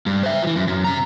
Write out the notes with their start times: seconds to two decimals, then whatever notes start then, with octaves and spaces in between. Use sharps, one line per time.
0.06 G2
0.23 C5 E5
0.43 E3 F3
0.56 F#2
0.68 F#2
0.84 C3 A#5